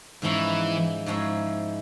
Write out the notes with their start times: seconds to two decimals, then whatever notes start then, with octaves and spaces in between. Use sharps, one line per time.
0.22 G#2 E3 F3 G#3 C#4 E4
1.06 G#2 F3 G#3 C#4 E4